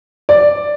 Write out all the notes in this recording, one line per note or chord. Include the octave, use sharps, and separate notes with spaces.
D5